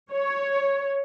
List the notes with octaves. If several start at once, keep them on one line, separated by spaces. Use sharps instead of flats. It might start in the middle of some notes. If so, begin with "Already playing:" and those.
C#5